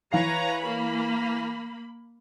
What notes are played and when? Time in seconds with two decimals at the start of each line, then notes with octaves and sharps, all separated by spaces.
0.12 E3 B4 C#5 F5 A#5 C7
0.60 A#3 B5